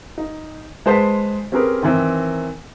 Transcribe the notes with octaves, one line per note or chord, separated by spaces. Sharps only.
D#4
G#3 B4 C5 A5 C6 B6
C4 C#4 G4 G#4 A#4 B4
D#3 E3 C4